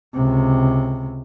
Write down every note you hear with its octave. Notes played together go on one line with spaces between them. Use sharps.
C#2 C3